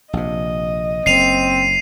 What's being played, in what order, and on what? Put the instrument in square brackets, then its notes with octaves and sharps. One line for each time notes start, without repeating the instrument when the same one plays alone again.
[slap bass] A#1 C3 [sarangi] D#5
[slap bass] F#1 [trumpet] C4 [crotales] C7 D#7 F7